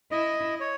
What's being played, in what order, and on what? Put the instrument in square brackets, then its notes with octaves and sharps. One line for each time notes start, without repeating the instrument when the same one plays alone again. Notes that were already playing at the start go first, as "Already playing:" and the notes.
[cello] E4 [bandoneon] D#5
[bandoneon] C#5